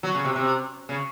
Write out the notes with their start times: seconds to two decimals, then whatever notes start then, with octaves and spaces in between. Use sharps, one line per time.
0.03 F#3
0.15 C#3
0.25 C3
0.36 C3
0.89 C#3